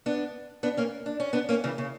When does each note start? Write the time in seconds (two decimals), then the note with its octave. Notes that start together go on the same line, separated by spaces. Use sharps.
0.06 B3 D4
0.63 B3 D4
0.77 A#3 C#4
1.06 D4
1.20 C#4
1.33 B3 D4
1.49 A#3 C#4
1.64 C#3 E3
1.78 C#3